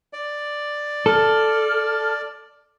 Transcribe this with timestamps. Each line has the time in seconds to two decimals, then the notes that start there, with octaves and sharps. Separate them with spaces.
0.13 D5
1.06 A4 F6